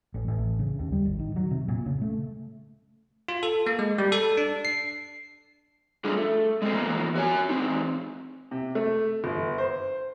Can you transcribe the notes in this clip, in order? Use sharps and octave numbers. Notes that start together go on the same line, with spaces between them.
A1
A1
C#3
D#2
G3
G#1
D#3
F#3
C3
A#2
C#3
A3
F4
A4
A#3
G#3
G3
A4
D4
C7
G3 A3 D4 F4 G#4
A3
G#3 A3 B3 C4
E3 F3 A#3 B3
F#4 C#5 G#5
E3 C4 D#4
C3
A3
G1
C5